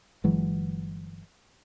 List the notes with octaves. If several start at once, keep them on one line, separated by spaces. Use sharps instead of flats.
G1 E3 F#3 G#3